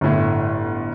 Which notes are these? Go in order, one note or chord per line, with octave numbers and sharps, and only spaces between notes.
G1 A2